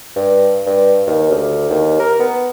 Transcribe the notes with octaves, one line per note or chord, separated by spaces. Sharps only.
G2
G2
D#2
D2
D#2
A#4
B3